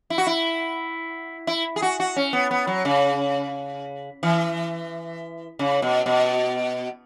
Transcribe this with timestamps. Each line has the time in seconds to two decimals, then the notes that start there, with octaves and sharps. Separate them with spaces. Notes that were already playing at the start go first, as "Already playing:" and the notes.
0.10 E4
0.18 F#4
0.27 E4
1.47 E4
1.76 G#4
1.82 F#4
2.00 F#4
2.16 C#4
2.33 B3
2.51 B3
2.67 F#3
2.85 C#3
4.23 E3
5.59 C#3
5.82 B2
6.06 B2